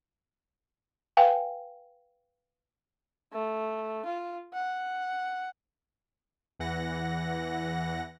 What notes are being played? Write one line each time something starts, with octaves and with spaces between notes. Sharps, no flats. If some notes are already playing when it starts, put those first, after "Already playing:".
B4 F5 G5 G#5
A3
F4
F#5
E2 E3 F#5 A#6